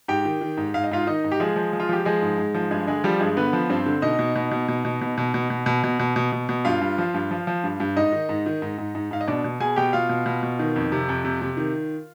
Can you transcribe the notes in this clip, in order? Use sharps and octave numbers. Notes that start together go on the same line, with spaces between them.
G#2 G4 G5
D#3
D#3
G#2
G#2 F5
D#5
G#2 F4 F5
D#3 D#4 D#5
G#2
G4
F3 G#3 G#4
F3
F3
F4
F3 G4
F3 G#3 G#4
G#2
G#2
F3
G2 G#3 G#4
D3 G#3 G#4
F3 G3 G4
G2 G#3 G#4
D3 B3 B4
F3
G2 C4 C5
D3
B2 D#4 D#5
B2
B2
B2
B2
B2
B2
B2
B2
B2
B2
B2
B2
B2
B2
B2
G2 F4 F5
G2
F3
G2
F3
F3
G2
G2
G#2 D#4 D#5
D#3
G#2
D#3
G#2
G#2
G#2
G#2 F5
D#5
B2 D4 D5
B2
B2 G#4 G#5
B2 G4 G5
B2 F4 F5
B2
B2
B2
D#3
F2
C3
F2
C3
C3
D#3